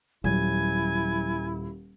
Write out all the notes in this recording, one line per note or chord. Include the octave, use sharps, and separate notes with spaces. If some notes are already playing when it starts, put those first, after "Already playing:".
D#1 F#3 E4 G#5